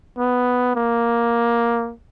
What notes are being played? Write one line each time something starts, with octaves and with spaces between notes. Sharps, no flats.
B3
A#3